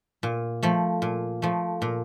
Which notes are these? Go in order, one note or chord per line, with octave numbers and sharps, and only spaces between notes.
A#2
F3 A3
A#2
F3 A3
A#2